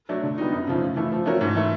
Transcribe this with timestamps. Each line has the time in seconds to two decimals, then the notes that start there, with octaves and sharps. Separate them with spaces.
0.09 F#3 A3 D4
0.23 D3
0.38 G3 B3 D#4
0.52 F#2
0.67 C#3 F3 A3
0.82 C#3
0.96 E3 A3
1.12 F3
1.26 A3 C#4 F#4 A#4
1.41 G#2
1.55 E3 A3